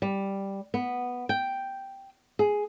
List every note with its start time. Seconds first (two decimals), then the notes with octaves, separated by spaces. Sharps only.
0.02 G3
0.74 B3
1.29 G5
2.39 G#4